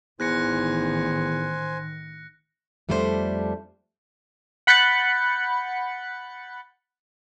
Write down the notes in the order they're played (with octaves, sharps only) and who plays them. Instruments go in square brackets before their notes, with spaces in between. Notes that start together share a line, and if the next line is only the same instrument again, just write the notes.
[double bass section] A1 D#3 [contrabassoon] E2 [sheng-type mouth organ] C5 G#5 [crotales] F#6 A#6 C#7
[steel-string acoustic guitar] F2 G3 A3 D4 E4 C5
[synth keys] F#5 B5 F#6 G6 A6 C#7